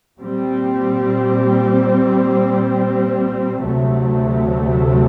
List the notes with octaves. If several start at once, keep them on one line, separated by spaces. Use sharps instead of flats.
A#2 G3 C4
D2 C3 F#3 A3